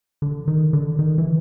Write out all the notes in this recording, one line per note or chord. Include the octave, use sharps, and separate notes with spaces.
D3
D#3
D3
D#3
E3